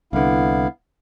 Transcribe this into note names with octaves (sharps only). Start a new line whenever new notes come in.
C2 D3 B3 E4 F5